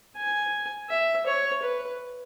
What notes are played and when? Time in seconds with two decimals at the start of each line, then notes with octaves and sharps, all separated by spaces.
0.16 G#5
0.89 E5
1.26 C#5
1.62 B4